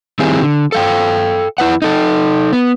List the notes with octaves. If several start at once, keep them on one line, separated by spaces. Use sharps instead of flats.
D#3 G3 C4 E4 G4 G#4
D3
A4 F5 G5
F2 E4 B4 F#5
D#4 A4
B3